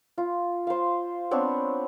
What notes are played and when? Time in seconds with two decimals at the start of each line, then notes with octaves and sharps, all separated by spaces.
0.18 F4
0.67 C5 F5
1.31 B3 C4 D4 C#5